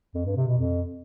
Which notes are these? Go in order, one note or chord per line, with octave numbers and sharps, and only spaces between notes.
F2
G2
C3
B2
F2